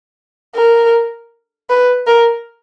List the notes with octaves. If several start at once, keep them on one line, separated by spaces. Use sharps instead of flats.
A#4
B4
A#4